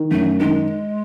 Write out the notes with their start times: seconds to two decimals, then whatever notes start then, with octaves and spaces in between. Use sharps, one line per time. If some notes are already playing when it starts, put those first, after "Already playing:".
Already playing: D#3
0.11 F#2 A3
0.39 D#3 G#3